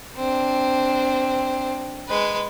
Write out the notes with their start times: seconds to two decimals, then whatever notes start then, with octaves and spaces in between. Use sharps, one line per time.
0.16 C4 D4
2.08 G#3 B4